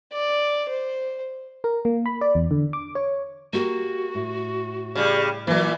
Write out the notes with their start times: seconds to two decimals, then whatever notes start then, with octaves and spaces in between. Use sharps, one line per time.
0.12 D5
0.69 C5
1.64 A#4
1.85 A#3
2.06 B5
2.21 D5
2.35 E2
2.51 D3
2.73 D6
2.95 C#5
3.53 A#3 F#4 G4 A#4
4.15 A2
4.95 C#3 G3
5.47 A#2 E3 F#3 A#3